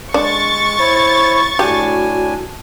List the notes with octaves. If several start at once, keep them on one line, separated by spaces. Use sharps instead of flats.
G#3 D4 C#6 A6
E4 C5 C#5
A2 D4 F#4 G4 G#5